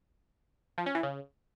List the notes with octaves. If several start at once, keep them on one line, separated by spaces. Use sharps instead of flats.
F3
C#4
E3
C#3